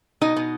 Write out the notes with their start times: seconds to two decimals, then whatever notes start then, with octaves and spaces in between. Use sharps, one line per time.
0.21 B2 D#4 D#5
0.36 B2